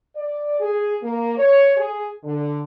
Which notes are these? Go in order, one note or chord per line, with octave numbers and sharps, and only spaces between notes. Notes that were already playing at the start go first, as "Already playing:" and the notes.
D5
G#4
A#3
C#5
G#4
D3